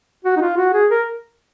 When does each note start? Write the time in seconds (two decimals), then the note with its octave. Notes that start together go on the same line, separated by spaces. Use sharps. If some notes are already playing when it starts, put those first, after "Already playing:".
0.25 F#4
0.36 D#4
0.41 F4
0.57 F#4
0.73 G#4
0.90 A#4